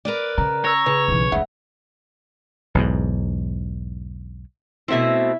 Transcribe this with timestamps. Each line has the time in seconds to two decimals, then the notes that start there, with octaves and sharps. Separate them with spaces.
0.05 A#4 B4 D5
0.38 C#3 A#5
0.65 C#5 A#5 E6 A#6
0.86 C#3 B4
1.08 B1 E3
1.32 C#2 C#3 A3 E5 F#5
2.75 B1 E2 G#2
4.88 B2 A3 C4 E4 E5